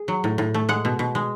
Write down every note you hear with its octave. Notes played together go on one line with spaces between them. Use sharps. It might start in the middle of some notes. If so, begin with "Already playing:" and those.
Already playing: G#4
F#3
A2
A2
A3
G#3 F#5
B2
B2
G#3